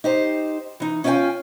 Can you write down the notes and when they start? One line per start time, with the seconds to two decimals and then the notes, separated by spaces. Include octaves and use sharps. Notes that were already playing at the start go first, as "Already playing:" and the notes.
0.04 D#4 G4 C5
0.80 E3 D#4
1.04 C#4 E4 F4 C#5 G5 G#5